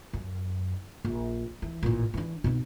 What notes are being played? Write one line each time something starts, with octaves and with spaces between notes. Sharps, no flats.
F#2
A#1
E3
A1 A#2
E3 D4
B2 D#4